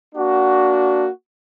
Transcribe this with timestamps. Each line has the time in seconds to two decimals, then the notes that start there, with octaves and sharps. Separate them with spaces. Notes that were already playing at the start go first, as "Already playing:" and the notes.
0.14 A#3 D4 F#4